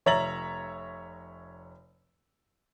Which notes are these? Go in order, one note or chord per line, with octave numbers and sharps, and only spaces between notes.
F1 C#5 E5 A#5 A6 F#7